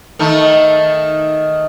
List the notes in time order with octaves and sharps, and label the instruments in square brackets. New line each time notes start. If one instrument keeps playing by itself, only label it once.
[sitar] D#3 A3